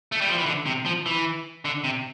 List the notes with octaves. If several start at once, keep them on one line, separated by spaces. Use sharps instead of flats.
A3
G3
F3
E3
D3
C3
F3
E3
D3
C3